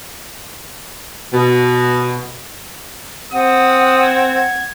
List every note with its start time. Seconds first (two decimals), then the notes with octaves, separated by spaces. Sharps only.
1.33 B2
3.33 C4 F#5 D#6
4.03 G#6